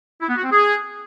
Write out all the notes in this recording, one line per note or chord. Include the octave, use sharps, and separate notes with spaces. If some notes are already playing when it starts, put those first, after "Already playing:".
E4
B3
F#4
C4
G#4